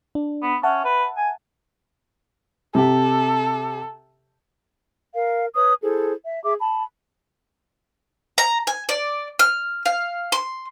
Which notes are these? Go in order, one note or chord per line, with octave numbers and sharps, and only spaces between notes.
D4
B3
C#4 E5 F#5 A5
B4
G#5
C3 G4 A4
A#4 F5
B4 C#5 D#6
E4 G#4 A4 C5
E5
G#4 E5 D6
A5 B5
A#5
G#5
D5
F6
F5
C6